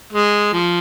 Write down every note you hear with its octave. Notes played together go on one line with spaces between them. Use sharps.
G#3
F3